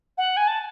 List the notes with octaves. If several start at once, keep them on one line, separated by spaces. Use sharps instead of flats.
F#5
G#5
A5